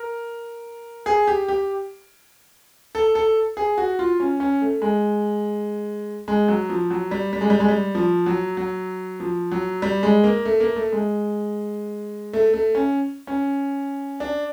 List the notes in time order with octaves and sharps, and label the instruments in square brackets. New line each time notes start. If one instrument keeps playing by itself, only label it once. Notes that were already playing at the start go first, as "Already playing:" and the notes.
Already playing: [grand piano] A#4
G#4
G4
G4
A4
A4
G#4
F#4
F4
C#4
C#4
A3
G#3
G#3
F#3
F3
F#3
G3
G3
G#3
G3
G#3
G3
F3
F#3
F#3
F3
F#3
G3
G#3
A#3
A3
A#3
A3
G#3
A3
A3
C#4
C#4
D4